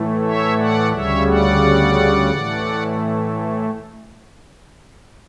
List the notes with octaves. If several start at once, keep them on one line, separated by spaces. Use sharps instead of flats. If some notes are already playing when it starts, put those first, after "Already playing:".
Already playing: A2 E3 A3
C#5 E5
D5 F#5
D2 C#3 G3 C#5 E5
D5 F#5
A2 E3 A3